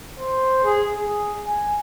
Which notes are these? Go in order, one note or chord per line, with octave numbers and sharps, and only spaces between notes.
C5
G#4
G#4
G#5